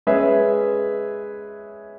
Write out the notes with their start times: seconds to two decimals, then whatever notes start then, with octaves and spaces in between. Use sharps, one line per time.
0.07 G#3 C#4 G#4 B4 E5